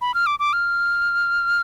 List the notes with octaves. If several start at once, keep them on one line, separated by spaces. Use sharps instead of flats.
B5
F6
D6
D6
F6